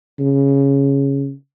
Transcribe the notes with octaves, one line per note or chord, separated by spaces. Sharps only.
C#3